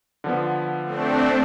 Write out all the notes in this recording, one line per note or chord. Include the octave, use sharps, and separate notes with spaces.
D3 F3 B3
A3 C4 D4